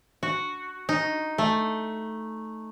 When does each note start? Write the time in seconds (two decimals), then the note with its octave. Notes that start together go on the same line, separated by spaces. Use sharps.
0.23 F#4
0.89 D#4
1.38 A3